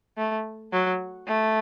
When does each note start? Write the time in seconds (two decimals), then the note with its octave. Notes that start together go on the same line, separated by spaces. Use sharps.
0.17 A3
0.73 F#3
1.27 A3